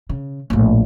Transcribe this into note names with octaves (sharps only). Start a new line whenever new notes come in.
C#3
A#1 A2